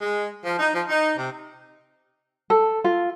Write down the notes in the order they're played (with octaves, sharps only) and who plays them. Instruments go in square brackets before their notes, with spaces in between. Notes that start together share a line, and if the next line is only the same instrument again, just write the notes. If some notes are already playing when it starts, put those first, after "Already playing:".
[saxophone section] G#3
F3
D#4
F3
D#4
C3
[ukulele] A4
F4